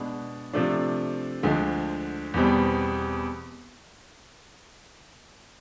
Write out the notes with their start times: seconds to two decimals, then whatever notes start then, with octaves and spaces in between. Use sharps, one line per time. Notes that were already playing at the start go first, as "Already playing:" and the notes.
Already playing: B2 G#3 B3 D4
0.53 C3 F3 A3 D4
1.43 D2 D3 F3 G#3
2.34 E2 B2 G3 C4